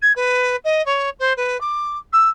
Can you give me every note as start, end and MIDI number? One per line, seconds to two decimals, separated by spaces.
0.01 0.12 92
0.15 0.56 71
0.64 0.84 75
0.85 1.09 73
1.19 1.33 72
1.36 1.59 71
1.60 1.97 86
2.12 2.29 88